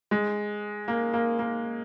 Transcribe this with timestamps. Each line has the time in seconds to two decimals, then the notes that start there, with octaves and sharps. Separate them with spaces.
0.11 G#3
0.88 A#3
1.14 A#3
1.39 A#3